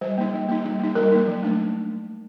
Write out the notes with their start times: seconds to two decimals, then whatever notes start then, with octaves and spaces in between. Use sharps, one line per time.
0.01 G3 C5
0.18 A#3 D#4
0.33 G3
0.49 A#3 D#4
0.64 G3
0.80 A#3 D#4
0.95 G3 A#4
1.12 A#3 D#4
1.27 F#3
1.43 A3 D4